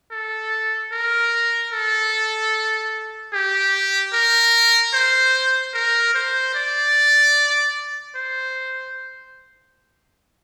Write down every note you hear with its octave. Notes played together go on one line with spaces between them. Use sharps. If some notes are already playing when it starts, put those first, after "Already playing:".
A4
A#4
A4
G4
A#4
C5
A#4
C5
D5
C5